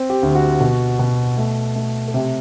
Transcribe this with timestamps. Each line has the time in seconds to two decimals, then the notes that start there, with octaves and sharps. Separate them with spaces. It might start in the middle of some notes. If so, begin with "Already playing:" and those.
Already playing: C4
0.10 G4
0.23 D2
0.35 F#4
0.60 B2
0.99 B2
1.37 A3
1.76 A3
2.08 A4
2.14 C3 G4